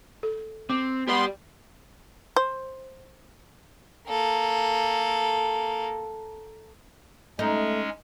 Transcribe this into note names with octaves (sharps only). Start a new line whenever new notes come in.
A4
C4 D6
B3 G4 D5 C6
C5
A#3 A4
G#3 A3 C#4 D#4